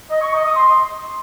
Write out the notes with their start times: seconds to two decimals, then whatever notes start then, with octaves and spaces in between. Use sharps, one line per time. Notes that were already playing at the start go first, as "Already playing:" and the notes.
0.10 D#5
0.21 C#6
0.33 D#5
0.44 D#6
0.55 C6